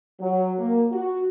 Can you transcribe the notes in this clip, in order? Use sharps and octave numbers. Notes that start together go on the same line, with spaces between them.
F#3
A#3
F#4